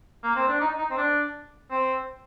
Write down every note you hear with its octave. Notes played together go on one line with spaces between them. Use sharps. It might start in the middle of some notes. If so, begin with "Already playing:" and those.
A#3
C4
D4
D#4
D#4
C4
D4
C4